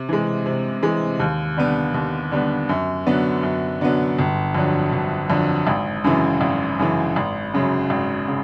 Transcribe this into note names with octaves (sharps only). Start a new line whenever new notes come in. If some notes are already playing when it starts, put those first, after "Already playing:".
Already playing: C3
E3 G#3
C3
E3 G#3
D#2
D3 G3 B3
D#2
D3 G3 B3
F#2
D3 F#3 B3
F#2
D3 F#3 B3
G1
F2 D3 F#3
G1
F2 D3 F#3
G#1
F#2 C#3 E3
G#1
F#2 C#3 E3
G#1
F#2 C#3 F#3
G#1
C#3